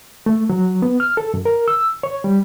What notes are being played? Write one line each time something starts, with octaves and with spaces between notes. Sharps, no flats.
A3
F#3
B3
F6
A4
F#2
A#4
E6
C#5
G3